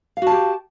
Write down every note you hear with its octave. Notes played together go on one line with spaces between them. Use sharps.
F#4 G4 F5 A5